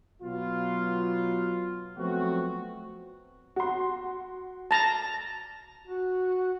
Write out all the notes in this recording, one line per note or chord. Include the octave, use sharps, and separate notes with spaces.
B2 F#3 B3 F4
F3 F#3 A3 B3 C4 F#4
F#4 C6
A5 A#5
F#4